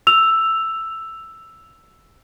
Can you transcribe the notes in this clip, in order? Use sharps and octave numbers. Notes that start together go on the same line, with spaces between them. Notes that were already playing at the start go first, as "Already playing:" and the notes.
E6 F7